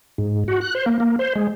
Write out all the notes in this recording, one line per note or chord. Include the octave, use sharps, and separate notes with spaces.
G#2
F#4
F#6
C5
A#3
A#3
C5
G#3